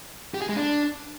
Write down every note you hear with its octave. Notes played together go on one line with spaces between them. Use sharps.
G4
G#4
G#3
D4